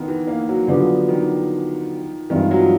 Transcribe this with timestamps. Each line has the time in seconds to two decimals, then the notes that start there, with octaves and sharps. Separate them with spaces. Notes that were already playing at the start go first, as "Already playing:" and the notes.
Already playing: D3 D#3 B3
0.08 E3
0.27 A#3
0.49 F#3
0.68 D3 F3 F#3 B3 D4 G4
1.09 D#3
2.30 G2 D#3 E3 G#3 C4 F4
2.51 F#3
2.60 F3